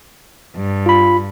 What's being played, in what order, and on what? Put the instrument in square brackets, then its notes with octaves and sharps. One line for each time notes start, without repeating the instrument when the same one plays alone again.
[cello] G2
[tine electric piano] F4 B5